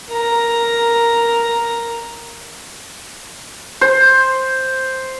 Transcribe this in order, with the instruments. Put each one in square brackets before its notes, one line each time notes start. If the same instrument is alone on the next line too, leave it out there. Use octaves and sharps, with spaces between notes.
[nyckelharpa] A#4 A#5
[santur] C5